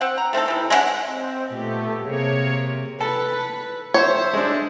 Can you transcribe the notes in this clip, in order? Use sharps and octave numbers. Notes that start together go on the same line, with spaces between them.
C4 F#5
A#5
A3 C4 D#4 A4
C3 E3 C4
G#3 A3 C#4 F#5
C4 D#5
A#2 A3 B3 G4
C3 A#3 G#4 C#5
A4 B4
C5 C#5 E5
G#3 D4